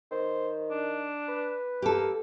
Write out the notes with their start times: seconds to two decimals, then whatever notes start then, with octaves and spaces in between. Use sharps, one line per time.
0.11 D#3 C5
0.71 D4
1.28 B4
1.82 A#3 G4 A4